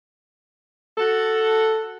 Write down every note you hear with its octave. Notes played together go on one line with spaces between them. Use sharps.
F#4 A4